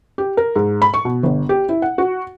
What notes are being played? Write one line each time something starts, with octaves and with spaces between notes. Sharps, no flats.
G4
A#4
G#2
B5
C#6
B2
G1
G4
E4
F#5
F#4